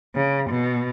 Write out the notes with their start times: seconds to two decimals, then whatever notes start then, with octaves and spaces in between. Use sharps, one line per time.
0.16 C#3
0.49 B2